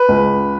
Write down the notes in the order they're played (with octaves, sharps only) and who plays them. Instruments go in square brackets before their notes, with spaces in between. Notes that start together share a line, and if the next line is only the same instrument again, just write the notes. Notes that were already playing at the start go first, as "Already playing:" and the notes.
Already playing: [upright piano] B4
C#2